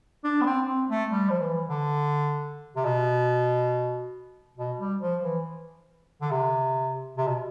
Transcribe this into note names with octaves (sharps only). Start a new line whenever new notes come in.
D4
B3
C4
C4
A3
G3
F3
E3
D3
C3
B2
B2
G3
F3
E3
D3
C3
C3
B2